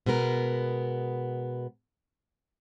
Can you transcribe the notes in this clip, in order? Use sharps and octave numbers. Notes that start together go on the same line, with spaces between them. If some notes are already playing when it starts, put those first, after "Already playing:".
B2 G#3 B3 A#4